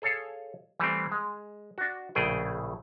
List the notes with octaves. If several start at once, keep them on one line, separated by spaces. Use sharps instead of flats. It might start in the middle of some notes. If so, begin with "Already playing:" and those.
G#4 A4 C#5 F5
E3 G3 A3 C4
G#3
D4 F#4
A#1 A2 C#3 A3 G#4 G5